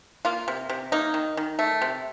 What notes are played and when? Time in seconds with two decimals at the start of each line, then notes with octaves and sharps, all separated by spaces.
0.25 A#3 F4
0.48 C3
0.69 C3
0.92 A#3 D#4
1.14 D#3
1.37 D#3
1.59 A3
1.82 C3